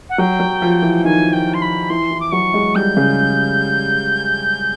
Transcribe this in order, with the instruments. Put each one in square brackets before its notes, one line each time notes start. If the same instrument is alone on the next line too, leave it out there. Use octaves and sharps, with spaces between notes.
[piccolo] F#5
[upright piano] F#3 [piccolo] G5
[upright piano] F#3
F3
E3
[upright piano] D#3 [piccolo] G#5
[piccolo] G5
C6
B5
[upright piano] E3 [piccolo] C6
[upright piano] E3
[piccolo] D6
[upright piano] F#3 [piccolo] C#6
[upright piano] G#3
[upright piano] G3 [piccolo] G6
[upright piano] C#3